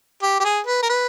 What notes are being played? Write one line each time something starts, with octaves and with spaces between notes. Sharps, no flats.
G4
G4
G#4
B4
A#4
B4